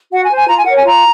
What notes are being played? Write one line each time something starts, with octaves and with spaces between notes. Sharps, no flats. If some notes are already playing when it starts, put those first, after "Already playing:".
F#4 F#5
G#5
C5
G#5
F4 A#5
G#5
A#4 C#5 F#5
G#5
F4 A#5